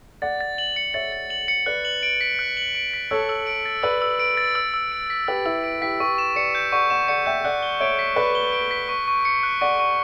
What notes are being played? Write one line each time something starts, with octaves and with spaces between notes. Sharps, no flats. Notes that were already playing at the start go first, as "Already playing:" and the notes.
D5 F#5 A6
A6
F#7
C#7
C#5 E5 A6
A6
F#7
C#7
B4 D5 F#6
F#7
D7
B6
F#6
F#7
D7
B6
A4 C#5 E6
E6
D7
A6
B4 D5 E6
E6
D7
A6
E6
E6
D7
B6
G4 B4 E6
E4 G4 E6
D7
E4 G4 B6
G4 B4 C#6
E7
B4 D5 C#7
G6
D5 F#5 C#6
D5 F#5 E7
D5 F#5 C#7
E5 G5 G6
D5 F#5 F#6
G7
C#5 E5 D7
B6
B4 D5 F#6
G7
D7
B6
C#6
C#6
C#7
F#6
D5 F#5 C#6
C#6